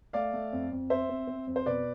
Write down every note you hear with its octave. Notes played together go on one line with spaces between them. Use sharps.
A3 D5 F5
A3
F2
F2
C4 C5 E5
C4
C4
F2
C5
B2 B4 D5